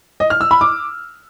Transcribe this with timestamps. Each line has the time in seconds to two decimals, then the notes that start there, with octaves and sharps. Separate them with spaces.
0.20 D#5
0.30 F6
0.41 E6
0.51 B5
0.61 D6